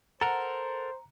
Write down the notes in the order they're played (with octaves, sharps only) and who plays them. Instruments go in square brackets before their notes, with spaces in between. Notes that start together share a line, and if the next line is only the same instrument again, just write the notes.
[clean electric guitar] A4 A#4 [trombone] C5 [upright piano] F#5 [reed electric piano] A#5